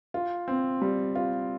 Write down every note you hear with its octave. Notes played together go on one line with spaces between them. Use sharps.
F4
C4
G3
F4